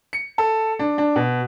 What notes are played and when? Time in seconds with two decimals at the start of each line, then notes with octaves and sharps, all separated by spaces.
0.13 C#7
0.38 A4
0.79 D4
0.98 D4
1.16 B2